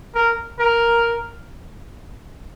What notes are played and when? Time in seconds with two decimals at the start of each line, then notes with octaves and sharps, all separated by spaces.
0.15 A#4
0.60 A#4